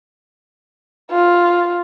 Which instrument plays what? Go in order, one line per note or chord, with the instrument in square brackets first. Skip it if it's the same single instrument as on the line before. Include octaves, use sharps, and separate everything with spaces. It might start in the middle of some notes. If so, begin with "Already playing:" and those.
[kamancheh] F4